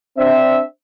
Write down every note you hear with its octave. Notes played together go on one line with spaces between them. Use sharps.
C4 D4 E5